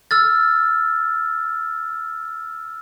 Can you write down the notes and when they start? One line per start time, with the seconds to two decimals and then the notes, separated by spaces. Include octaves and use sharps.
0.11 E6 F6 A6